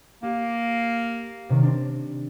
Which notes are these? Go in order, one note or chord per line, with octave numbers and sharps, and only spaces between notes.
A#3 G4
C3 D#3
C4 D4